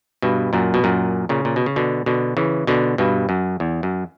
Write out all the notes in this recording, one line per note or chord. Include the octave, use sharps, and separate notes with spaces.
G2 B2
F#2 A#2
B2
F#2 A#2
A#2 C#3
A#2
B2
C#3
B2 D3
B2 D3
C#3 E3
B2 D3
G2 B2
F#2
E2
F#2